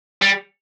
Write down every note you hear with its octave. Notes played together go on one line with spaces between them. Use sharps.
G3